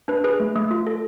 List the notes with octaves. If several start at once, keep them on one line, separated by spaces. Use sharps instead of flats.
D4 B4
G#4 B4
A3
A3
F4
A4